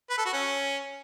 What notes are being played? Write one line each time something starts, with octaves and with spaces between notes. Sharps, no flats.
B4
A4
F#4
C#4